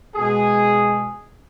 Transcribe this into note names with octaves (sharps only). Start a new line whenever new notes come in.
B2 G#3 G#4